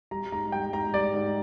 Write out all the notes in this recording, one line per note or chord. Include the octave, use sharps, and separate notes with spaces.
G3 A#5
G#2 A#5
G3 G5
G#2 A#5
G3 D5
G#2